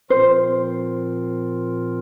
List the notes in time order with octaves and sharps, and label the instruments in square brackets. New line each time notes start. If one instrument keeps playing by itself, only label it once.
[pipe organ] A#2 F3 C4 F4 A#4 [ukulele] C5